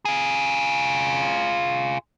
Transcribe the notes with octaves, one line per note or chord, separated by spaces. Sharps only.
F4 G#4